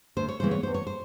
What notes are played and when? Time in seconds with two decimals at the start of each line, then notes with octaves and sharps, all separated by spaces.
0.17 D2 C5
0.29 C#5
0.40 C#3 E3 G#3 B3 C5
0.51 C#5
0.63 E2 C5
0.74 C#5
0.87 C5